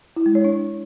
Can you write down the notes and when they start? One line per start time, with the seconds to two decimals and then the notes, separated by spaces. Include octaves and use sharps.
0.16 E4
0.26 G#3
0.35 C#5
0.45 D4